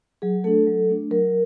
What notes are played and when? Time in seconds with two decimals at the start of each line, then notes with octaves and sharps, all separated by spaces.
0.22 F#3 G#4
0.44 A3 D4 A4
0.67 F#3
0.89 A3 D4
1.11 F#3 A#4